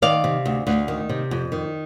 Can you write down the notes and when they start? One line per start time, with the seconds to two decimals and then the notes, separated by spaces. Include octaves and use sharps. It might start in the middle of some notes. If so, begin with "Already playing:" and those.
0.02 D#3 D5 F5
0.24 C3
0.46 D2
0.67 D2
0.88 D#3
1.09 C3
1.31 F2
1.52 D#3